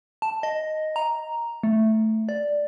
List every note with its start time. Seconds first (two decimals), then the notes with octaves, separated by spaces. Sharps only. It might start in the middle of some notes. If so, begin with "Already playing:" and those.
0.22 A5
0.43 D#5
0.96 A#5
1.63 A3
2.29 D5